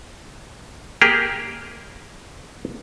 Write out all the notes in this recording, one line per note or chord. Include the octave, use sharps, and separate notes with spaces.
A#3 G4 G#4 A#4